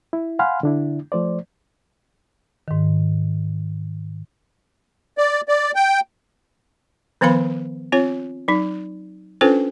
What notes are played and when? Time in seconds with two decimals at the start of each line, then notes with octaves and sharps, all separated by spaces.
0.13 E4
0.39 F5 F#5 G#5 B5 C6 F6
0.63 D3 D4 E4
1.12 F3 A3 C5 D5
2.68 G#2 D#3
5.18 D5
5.48 D5
5.75 G5
7.21 D#3 F3 B3 B4 F5 B5
7.92 C4 F4 C#5
8.48 F#3 D#4
9.41 C#4 D4 F4 A4 B4 C5